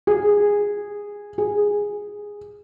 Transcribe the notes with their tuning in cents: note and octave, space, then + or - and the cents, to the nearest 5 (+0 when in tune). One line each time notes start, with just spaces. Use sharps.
G#4 -15
G#4 -10